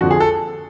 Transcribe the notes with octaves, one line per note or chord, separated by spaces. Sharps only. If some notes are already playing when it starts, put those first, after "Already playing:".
F2 D3 F3 F#4
G#4
A4